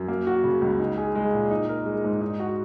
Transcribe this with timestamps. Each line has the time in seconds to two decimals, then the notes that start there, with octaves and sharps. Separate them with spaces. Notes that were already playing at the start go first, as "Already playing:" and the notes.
Already playing: F#2
0.08 A#3
0.27 F#4
0.44 C#3
0.62 C#2
0.79 D#4
0.98 G#4
1.15 G#3
1.33 A#2
1.51 D#4
1.69 A#4
1.86 G#3
2.04 G#2
2.21 D#4
2.40 F#4